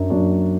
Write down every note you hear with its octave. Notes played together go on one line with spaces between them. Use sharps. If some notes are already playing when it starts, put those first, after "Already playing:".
Already playing: F#2 F#3 D4
F#2 F#3 D4